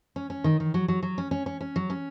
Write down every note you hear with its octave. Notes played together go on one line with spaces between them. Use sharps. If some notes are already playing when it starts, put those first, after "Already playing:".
C#4
C#4
D#3
D#3
F#3
F#3
F#3
C#4
C#4
C#4
C#4
F#3
C#4